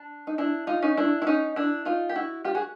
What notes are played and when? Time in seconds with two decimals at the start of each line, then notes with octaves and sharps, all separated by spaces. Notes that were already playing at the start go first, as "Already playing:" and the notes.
Already playing: D4
0.27 D#4
0.38 D4 E4
0.67 D#4 F4
0.82 C#4 D#4
0.97 D4 E4
1.22 E4
1.27 C#4 D#4
1.56 D4 E4
1.85 D#4 F4
2.09 G4
2.16 E4 F#4
2.44 F4 G4
2.55 F#4 G#4